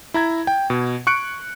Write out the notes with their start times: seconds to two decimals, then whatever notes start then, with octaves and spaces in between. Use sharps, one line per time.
0.14 E4 A#5 G#6
0.47 G5
0.70 B2
1.07 C#6 F#6 C#7 D7